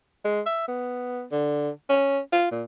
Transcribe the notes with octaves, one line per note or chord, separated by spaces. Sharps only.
G#3
E5
B3
D3
C#4
F4
A#2